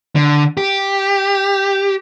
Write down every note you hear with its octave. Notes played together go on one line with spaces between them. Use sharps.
D3
G4